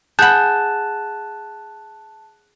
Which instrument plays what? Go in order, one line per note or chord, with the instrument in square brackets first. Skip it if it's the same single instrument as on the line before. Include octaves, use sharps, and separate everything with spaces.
[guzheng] G#4 B5 [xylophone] F#5 G6 [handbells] A5 [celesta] F#6